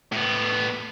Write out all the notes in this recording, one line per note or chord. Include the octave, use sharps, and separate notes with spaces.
A2 B3